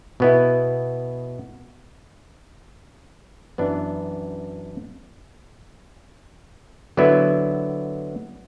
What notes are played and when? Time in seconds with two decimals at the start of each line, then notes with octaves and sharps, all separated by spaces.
0.20 B2 B3 E4
3.58 F#2 E3 B3 D4
6.97 D3 F#3 B3 E4